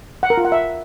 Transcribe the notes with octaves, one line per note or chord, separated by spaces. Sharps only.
F#5
A#4
F4
F#5
E5